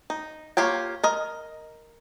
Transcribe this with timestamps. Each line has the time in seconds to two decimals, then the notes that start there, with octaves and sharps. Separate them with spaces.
0.10 D#4
0.57 A#3 F4 G4 C#5 G5
1.04 A#4 D#5 A#5